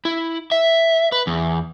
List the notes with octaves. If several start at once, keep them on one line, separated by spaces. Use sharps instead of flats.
E4
E5
B4
E2